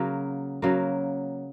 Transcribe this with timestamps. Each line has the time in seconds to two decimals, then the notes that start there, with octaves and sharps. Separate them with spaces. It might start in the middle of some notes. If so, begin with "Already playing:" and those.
Already playing: C#3 F#3 A#3
0.62 C#3 F#3 A#3